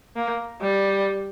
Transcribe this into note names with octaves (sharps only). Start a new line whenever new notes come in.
A#3
G3